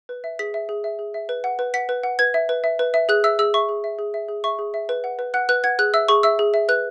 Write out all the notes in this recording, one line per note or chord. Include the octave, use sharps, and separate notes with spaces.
B4
E5
G#4 B6
E5
G#4
E5
G#4
E5
B4
F#5
B4
F#5 B6
B4
F#5
B4 G#6
E5
B4
E5
B4
E5
G#4 F#6
E5 E6
G#4 E6
E5 C#6
G#4
E5
G#4
E5
G#4
E5 C#6
G#4
E5
B4
F#5
B4
F#5 F#6
B4 F#6
F#5 G#6
G#4 F#6
E5 E6
G#4 C#6
E5 E6
G#4
E5
B4 F#6